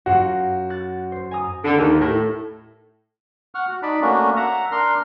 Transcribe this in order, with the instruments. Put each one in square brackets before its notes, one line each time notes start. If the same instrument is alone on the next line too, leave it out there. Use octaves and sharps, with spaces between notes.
[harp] F#2 F4 F#5 [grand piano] F#4
[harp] F#6 A6
C5
G#5 A#5 D#6
[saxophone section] D3
D#2
A2
[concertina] F#5 C#6 F6
F#4
D#4 D5 A5 B5
A3 A#3 C#4 D4 F#4
E5 F#5 A#5
D4 A#4 C6 F6